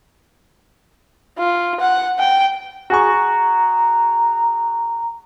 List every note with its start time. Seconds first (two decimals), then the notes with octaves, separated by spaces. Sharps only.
1.38 F4
1.80 F#5
2.19 G5
2.90 F#4 G#4 A#5 C#6